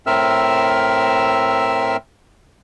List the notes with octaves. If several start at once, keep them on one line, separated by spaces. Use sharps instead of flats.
A2 C4 A#4 E5 E6 F6